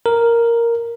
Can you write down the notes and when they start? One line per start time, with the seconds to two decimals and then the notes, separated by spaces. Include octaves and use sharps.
0.06 A#4